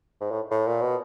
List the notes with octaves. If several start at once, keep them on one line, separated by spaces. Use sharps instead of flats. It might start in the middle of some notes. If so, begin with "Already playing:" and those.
G#2
A2
A2
A#2
B2